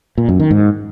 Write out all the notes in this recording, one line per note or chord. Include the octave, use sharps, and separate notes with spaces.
A#2
F#2
D#3
G#2